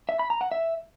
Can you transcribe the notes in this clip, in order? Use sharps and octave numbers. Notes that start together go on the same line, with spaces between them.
E5
B5
A#5
F#5
E5